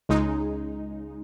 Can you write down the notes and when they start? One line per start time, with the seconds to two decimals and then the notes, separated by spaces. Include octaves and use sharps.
0.09 C#2 C#3 G#3 D#4